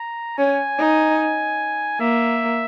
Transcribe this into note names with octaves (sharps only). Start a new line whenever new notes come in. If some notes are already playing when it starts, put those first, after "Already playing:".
Already playing: A#5
C#4 G#5
D#4
A#3 E5